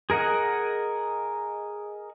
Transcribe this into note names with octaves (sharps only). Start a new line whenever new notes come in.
G#4 A#4 D#5 F#5